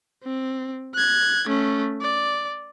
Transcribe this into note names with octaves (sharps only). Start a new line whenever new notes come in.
C4
F#6 G#6
A3 C#4
D5